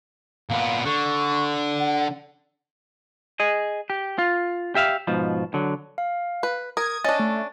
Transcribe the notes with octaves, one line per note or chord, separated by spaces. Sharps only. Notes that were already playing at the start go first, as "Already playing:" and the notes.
A#2 B3 F5
D3 C#6
F#5
G#4 D#5
G4
F4
G4 E5 F5
G#2 B2 F3
D3 F#3
F5
B4
A#4 D#6 G#6
C#4 D4 D#5 A6
A3